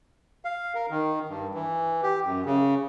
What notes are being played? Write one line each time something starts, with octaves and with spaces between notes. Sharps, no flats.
F5
A#4
D#3
G2
E3
G4
F#2
C#3